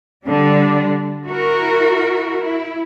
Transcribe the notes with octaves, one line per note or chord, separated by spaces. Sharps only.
D3 G3 D4
E4 F#4 A#4
E4